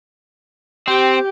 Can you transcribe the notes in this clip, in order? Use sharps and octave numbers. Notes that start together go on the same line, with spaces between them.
C4 G4